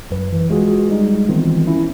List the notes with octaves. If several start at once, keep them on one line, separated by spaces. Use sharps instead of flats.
G#1 F#2 F#3 B4
E3
G#3 F4 F#4 G#4
G3 G#3 D#4
D#3 E3 B3 C4 D#4 F4
C#4 E4